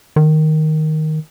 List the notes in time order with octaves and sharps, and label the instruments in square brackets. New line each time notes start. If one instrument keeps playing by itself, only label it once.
[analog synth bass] D#3